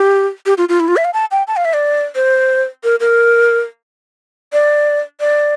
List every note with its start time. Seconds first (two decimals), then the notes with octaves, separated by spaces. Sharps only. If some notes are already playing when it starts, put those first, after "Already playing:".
Already playing: G4
0.46 G4
0.58 F4
0.69 F4
0.80 E4
0.88 F4
0.97 E5
1.05 F5
1.14 A5
1.31 G5
1.48 A5
1.57 F5
1.65 E5
1.74 D5
2.15 C5
2.84 A#4
3.00 A#4
4.53 D5
5.20 D5